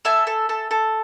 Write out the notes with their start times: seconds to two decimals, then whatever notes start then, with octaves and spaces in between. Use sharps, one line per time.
0.05 A4 E5 G#5
0.27 A4
0.49 A4
0.71 A4